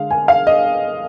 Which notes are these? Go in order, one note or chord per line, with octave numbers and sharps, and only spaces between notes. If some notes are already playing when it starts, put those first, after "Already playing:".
Already playing: D3 G#3 F5
G#5
F5
D#5